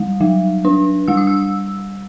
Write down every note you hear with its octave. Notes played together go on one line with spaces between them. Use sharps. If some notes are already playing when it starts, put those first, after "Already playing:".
Already playing: G3
F#3
D4
G3 E6
D#6
E6